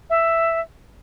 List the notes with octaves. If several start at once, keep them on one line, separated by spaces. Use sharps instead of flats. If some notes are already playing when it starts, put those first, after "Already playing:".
E5